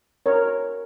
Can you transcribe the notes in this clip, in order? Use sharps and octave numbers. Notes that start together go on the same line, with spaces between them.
A#4 C#5